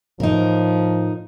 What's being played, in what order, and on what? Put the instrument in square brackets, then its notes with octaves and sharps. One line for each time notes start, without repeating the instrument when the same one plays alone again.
[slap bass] A2 [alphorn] F3 [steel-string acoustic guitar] D#4 A#4